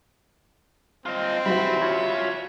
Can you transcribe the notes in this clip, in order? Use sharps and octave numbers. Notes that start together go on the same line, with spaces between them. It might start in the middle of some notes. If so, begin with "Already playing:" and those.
C4 F4 D#5
E3 G3 F#4 E5 B5
F4 C#5